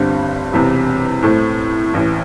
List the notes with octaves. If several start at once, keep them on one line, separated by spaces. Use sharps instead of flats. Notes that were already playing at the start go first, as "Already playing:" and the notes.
Already playing: G1 G2 D3 G3 C4
E1 E2 C3
A2 A3 C4
A1 A2 E3